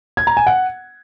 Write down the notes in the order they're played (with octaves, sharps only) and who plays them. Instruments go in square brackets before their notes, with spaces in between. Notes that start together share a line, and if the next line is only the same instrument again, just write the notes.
[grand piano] G#6
A#5
G#5
F#5